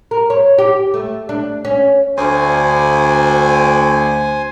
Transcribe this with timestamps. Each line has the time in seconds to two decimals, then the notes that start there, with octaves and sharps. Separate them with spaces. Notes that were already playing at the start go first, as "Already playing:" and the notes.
0.11 A#4
0.30 C#5
0.58 G4
0.94 A3
1.29 D4
1.65 C#4
2.17 D2 C5 G#5